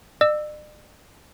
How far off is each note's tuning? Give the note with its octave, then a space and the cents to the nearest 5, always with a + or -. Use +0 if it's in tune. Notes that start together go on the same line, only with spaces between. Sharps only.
D5 +45 E6 +0